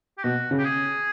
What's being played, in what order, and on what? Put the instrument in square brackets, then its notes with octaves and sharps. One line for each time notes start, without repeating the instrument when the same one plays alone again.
[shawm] G4
[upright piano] B2 [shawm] F#4
[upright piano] C#3
[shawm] G4
G#4